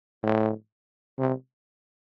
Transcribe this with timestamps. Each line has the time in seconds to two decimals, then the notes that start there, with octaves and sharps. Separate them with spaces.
0.23 A2
1.19 C3